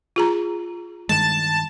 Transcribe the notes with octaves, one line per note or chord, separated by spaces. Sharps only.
F4 G#4 A#5
G2 D#3 G#3 A5